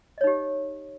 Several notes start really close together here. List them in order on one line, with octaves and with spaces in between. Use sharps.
D#5 C#5 D#4 G4